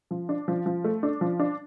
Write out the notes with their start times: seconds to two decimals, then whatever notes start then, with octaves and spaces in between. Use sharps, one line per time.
0.11 F3
0.29 D4
0.48 F3
0.66 F3
0.84 A3
1.03 D4
1.21 F3
1.39 D4